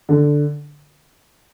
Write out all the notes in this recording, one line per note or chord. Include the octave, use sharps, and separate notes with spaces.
D3